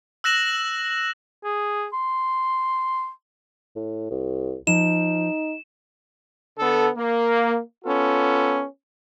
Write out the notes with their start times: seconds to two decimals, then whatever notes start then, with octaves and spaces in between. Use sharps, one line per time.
0.24 E6 F#6 A#6 E7 F#7
1.44 G#4
1.93 C6
3.76 A2
4.11 C2
4.67 F3 D#4 E7
6.59 D3 B3 A4
6.95 A#3
7.85 B3 C#4 F4 A4